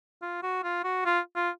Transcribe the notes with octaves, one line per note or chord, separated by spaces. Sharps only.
F4
F#4
F4
F#4
F4
F4